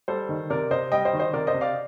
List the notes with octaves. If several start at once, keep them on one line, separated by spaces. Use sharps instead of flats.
G3 A4 C5
D#3
C3 A#4 D5
C3 C5 D#5
G3 D#5 G5
C5 D#5
D#3
C5 D#5
C3 A#4 D5
C5 D#5
C3
D5 F5